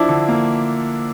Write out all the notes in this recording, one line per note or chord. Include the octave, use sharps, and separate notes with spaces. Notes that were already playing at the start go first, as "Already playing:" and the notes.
Already playing: F3 D4 E4
D3
A#3